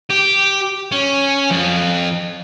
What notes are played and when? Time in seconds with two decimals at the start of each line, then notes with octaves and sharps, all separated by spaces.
0.10 G4
0.92 C#4
1.51 F2